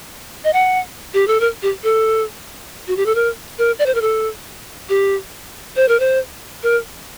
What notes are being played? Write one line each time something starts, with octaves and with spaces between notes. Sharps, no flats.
D#5
F#5
G4
A4
A#4
G4
A4
F#4
G4
A4
A#4
A#4
D5
C5
A#4
A4
G4
C5
A#4
C5
A#4